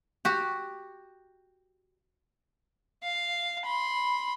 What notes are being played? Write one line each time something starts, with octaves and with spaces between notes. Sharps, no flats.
F#4 G4
F5
B5 C6